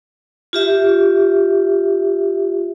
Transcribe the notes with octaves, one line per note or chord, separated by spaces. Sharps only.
F4 G4 E5